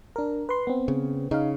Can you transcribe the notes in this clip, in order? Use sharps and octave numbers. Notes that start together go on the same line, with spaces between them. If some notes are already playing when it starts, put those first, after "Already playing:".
D4 A#4
B4 C6
B3 C4
C#3
C#3 D#4 F5